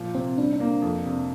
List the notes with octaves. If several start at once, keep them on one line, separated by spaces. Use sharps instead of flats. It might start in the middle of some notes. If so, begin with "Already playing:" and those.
Already playing: A#2 F3
C3 C4
G3 D4
D4
A#3
F2
C3